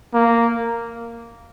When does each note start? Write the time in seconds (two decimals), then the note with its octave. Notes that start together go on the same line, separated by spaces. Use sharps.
0.14 A#3